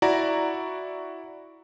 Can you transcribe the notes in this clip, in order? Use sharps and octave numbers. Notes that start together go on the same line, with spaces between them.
E4 F#4 D5 A#5